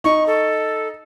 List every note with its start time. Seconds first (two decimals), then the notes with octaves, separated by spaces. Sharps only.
0.04 D#4 C#6
0.26 A4